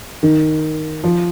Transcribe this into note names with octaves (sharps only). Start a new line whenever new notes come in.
D#3
F3